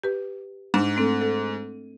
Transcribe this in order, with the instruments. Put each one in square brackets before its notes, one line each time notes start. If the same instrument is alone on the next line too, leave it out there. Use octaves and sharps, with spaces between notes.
[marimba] G4 B4
[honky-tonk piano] G#2 [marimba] D4
[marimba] A3 C4 A4
A4